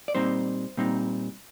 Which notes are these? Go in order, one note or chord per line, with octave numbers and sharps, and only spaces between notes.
D5
A#2 G3 C4 D#4 C5
A#2 G3 C4 D#4